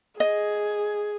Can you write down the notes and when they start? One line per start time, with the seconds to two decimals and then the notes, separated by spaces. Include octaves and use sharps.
0.20 G#4 D#5